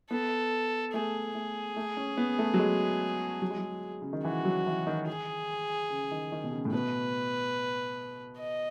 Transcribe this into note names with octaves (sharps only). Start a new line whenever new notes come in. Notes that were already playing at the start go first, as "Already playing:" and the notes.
B3 A4
A3 G#4
A3
A3
C#4
B3
A3
F#3
G#3
F#3
G#3
F#3
C#3
D#3
E3 F#4
F#3
E3
D#3
G#4
C#3
D#3
D#3
B2
C#3
A2
B2 B4
D#5